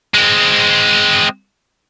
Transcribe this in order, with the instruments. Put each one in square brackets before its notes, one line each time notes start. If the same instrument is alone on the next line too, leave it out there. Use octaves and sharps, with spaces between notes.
[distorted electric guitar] G#3 C4